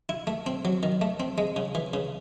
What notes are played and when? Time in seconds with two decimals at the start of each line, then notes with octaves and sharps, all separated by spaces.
0.09 E4
0.27 A3
0.46 C4
0.65 F#3
0.83 D#3
1.01 A3
1.20 C4
1.38 G#3
1.56 C#3
1.75 E3
1.94 C#3